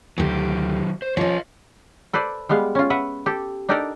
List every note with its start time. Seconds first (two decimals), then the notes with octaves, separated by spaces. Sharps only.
0.18 D2 D#3 F#3 G4
1.02 C5
1.17 F3 C#4 C#5 D#5
2.13 A4 B4 C5 D5
2.49 G3 G#3 B3 F5
2.75 C#4 F4
2.90 B4 E5 F#5
3.26 G4 A4
3.69 D4 D#4 G4 A4 A#4 D5